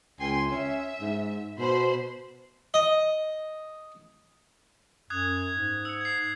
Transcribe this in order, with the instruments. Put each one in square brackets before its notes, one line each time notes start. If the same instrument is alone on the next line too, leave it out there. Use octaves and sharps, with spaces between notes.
[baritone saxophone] C#2 [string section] G5 G#5 C6
[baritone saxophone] C#4 [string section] E5
[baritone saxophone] G#2
[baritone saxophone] B2 [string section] C5 B5 C6
[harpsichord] D#5
[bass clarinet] F#2 [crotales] D#6 F#6 G#6
[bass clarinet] G#2
[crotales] E6 C#7
G#6 C7
G#6 C7